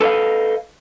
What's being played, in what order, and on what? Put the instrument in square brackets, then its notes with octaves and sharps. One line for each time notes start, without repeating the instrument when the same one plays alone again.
[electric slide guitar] A4 B4 C#5 D#5 F5